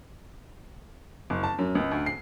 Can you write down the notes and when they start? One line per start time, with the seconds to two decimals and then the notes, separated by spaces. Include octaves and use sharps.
1.30 F#1
1.43 A5
1.58 F#2
1.75 C#2
1.92 D2
2.06 C7